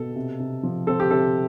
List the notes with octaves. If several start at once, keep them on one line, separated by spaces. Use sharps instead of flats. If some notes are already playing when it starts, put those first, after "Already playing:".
Already playing: B2 A4
C3
C3
F3
C4 A4
G4
C3 A4